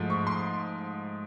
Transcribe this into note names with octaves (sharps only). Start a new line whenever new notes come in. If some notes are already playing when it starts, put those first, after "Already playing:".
Already playing: G#2 F3 A3
C#6
C6